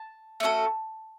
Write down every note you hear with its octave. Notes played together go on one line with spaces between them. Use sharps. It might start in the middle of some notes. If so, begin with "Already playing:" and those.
Already playing: A5
A3 C#4 F#4 A4